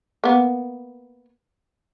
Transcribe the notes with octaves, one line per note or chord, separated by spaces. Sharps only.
A#3 B3